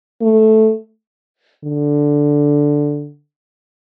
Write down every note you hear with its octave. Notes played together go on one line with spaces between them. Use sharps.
A3
D3